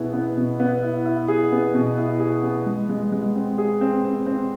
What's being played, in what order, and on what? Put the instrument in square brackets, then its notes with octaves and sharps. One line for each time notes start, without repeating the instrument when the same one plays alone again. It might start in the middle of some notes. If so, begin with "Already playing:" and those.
Already playing: [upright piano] B2 B3 E4 G#4
B3
B2
B3
E4
E4
G#4
B3
B2
E4
G#4
B3
G#3
G#3
G#3
C4
G#4
C4
C4
C4